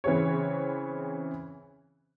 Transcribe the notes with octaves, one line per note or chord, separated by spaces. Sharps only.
C#3 E3 C4 G#4 C#5